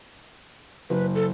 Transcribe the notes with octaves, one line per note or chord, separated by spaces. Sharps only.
F#1 B4
A4